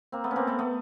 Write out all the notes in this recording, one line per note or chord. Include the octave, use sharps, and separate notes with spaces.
A#3 C4
A3 B3
C#4
A#3 C4
A3 B3
A3 B3